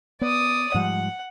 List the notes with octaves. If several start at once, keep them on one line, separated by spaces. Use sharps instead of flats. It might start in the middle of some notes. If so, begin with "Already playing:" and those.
B3 D5 D#6
G#2 F3 G3 F#5